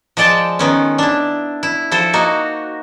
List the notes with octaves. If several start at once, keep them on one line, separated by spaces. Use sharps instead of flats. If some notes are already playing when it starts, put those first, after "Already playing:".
F3 G#3 D5 G5 A5
D#3 B3 C#4
D4 E4
E4
F3 E4 A4 C5
A#3 D#4 F#4